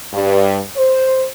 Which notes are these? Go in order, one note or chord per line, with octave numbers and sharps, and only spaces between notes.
G2
C5